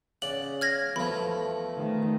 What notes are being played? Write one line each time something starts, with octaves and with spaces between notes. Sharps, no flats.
C#3 D5 F#5 F#7
F6 G#6 A#6
E2 F3 A3 B5
C2 D#3 A3